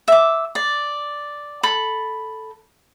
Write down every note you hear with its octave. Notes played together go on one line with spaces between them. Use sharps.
E5 D6
D5
A4 B5